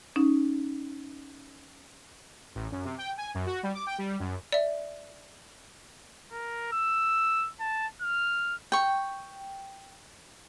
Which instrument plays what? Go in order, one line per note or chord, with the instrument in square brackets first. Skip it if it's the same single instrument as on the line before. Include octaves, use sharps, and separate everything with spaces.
[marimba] C#4 D#4
[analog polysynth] A1
F#2
C3
G5
G#5
F#2
F#4
G3
D6
G5
G3
F#2
[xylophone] D5 E5
[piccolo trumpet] A#4
E6
A5
F6
[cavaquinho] G5 C#6